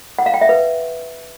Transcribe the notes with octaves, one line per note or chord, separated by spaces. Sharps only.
F#5
F5
G5
E5
B4